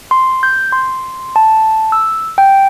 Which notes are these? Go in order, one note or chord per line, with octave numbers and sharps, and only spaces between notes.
C6
G6
C6
A5
E6
G5